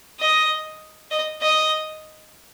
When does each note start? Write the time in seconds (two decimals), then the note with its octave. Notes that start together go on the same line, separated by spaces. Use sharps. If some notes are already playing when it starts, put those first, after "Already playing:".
0.19 D#5
1.11 D#5
1.42 D#5